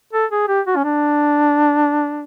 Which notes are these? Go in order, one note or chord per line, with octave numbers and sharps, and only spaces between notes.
A4
G#4
G4
F#4
C#4
D4